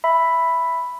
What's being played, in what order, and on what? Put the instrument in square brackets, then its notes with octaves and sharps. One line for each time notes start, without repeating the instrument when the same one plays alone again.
[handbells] E5 B5